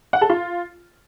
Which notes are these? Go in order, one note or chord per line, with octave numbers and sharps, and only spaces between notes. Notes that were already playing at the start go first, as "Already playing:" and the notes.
F#5
A4
F4